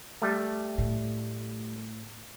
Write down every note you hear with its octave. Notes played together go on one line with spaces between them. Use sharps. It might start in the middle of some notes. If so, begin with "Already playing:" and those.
G3 A3
A2